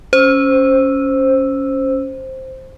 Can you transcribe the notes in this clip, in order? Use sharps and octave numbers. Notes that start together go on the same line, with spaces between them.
C#4 C5 E6